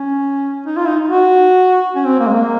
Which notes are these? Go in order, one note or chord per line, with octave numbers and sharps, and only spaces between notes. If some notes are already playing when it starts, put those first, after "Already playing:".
Already playing: C#4
D#4
F4
D#4
F#4
C#4
C4
A#3
G#3
A#3